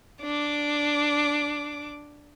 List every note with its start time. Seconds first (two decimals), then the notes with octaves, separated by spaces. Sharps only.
0.22 D4 D6